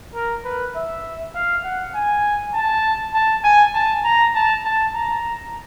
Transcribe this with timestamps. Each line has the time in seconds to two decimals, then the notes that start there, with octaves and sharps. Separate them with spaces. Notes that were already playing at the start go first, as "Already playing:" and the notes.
0.15 A#4
0.45 B4
0.75 E5
1.35 F5
1.64 F#5
1.95 G#5
2.54 A5
3.14 A5
3.44 G#5
3.74 A5
4.04 A#5
4.34 A5
4.65 A5
4.95 A#5